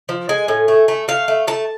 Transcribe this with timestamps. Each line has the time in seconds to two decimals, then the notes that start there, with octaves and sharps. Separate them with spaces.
0.09 F3
0.29 G#3 G#5
0.48 A2
0.68 A3
0.88 A3
1.08 A3 F5
1.28 A3
1.47 A3 A5